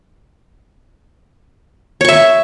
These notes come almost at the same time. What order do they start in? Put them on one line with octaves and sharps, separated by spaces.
C#5 C#6 E5